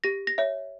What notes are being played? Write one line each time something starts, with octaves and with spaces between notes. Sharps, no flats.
G4 A#6
A#6
C#5 E5